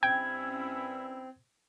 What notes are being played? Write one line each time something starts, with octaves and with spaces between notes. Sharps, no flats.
G2 C4 C#4 E4 G5 G#6